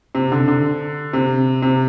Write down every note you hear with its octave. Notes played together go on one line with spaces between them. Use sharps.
C3
D3
D3
C3
C3